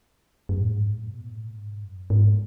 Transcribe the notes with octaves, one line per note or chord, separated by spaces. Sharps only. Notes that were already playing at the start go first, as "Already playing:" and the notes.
F#2
A2
G#2
A2
B2
A2
G#2
F#2
G#2